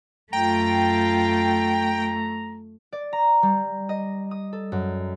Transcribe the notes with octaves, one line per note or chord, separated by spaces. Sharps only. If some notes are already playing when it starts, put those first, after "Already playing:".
F#2 A3 F4 G5 A#5
D5
A#5
G3
D#5
D#6
A4
F#2